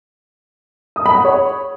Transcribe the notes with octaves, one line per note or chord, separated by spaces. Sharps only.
D#6
B5
F#5
C#5